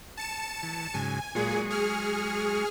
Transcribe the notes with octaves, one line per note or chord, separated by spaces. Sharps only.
A5 C#7 E7
E3
G#2 C#3 F#3 G#5
A#2 F#3 G#3 G#4 G#5 C#6
G#4 F6